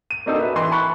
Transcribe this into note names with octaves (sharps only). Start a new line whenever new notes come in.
D#7
A#3 C4 D4 D#4 F#4 A4
B4 E5
E3 C6
A5 B5 C#6 F#6